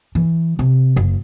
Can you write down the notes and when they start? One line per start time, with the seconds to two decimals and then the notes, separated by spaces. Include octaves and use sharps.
0.15 E3
0.59 C3
0.96 F#1